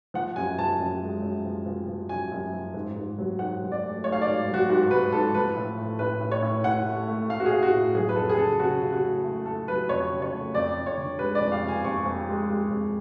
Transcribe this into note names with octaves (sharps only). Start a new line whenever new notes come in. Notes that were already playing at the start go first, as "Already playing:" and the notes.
F3 F#5
F#2 G#5
F3 A5
F#2
G#3
F#2
F3
F3
F3
F#2 G#5
F#2
F3
G#2
G#2
F#3
G#2 F#5
F#3
D5
A3
A3 C#5
F5
D5
G#2
F#3
F#4
G#2 F#4
G#2 B4
G#2 A4
F3 B4
A2
A3
A2 B4
A2
C#5
A2
A2 F#5
A3
A3
A2 F5
F#4
G#4
A2
F#4
A2
F#3 G#4
B4
F2 A4
G#4
C#3 A4
C#3 F#4
C#3
F#4
A3
A3
A3 A4
F#3 B4
F2 C#5
C#3
C#5
A3
F2 D5
F2
C#5
D3
G#3 B4
D5
F2
F5
F2
G#5
F2 C#6
F2
G#3
G#3
F2